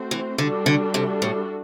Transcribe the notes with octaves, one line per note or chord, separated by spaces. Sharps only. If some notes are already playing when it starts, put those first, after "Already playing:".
Already playing: A3 C4 F#4 C5
E3
D3 G3 D4 F#4 A4
D3
C3
A2